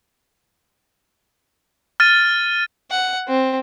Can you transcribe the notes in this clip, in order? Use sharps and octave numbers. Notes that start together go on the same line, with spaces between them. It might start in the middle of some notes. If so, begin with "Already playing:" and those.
F6 A6 D#7
F#5
C4